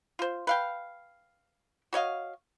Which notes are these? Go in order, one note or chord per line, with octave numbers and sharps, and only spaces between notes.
F4 C5
B4 F5 G5
F#4 C#5 D#5 F5